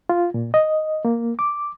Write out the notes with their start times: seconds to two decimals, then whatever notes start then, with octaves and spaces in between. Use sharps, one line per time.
0.09 F4
0.34 A#2
0.54 D#5
1.05 A#3
1.39 D6